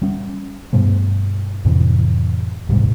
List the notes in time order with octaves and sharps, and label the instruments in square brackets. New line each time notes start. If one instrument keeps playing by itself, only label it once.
[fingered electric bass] G3 C#4
G2 B2 G3 A3
F2 A2 C3 E3
D#1 C2 G#2 G3